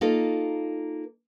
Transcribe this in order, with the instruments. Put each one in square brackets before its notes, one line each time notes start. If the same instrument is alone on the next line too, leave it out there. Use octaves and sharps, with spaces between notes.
[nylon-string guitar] A#3 D#4 F4 A4